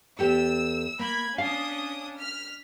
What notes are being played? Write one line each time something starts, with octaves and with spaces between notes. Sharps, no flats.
E2 G4 A4 E6
A#3 B5 G#6
C#4 D4 F5 D#6
F6 B6